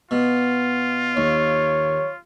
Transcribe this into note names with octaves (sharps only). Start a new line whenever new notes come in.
B2 F4
D#2 C#5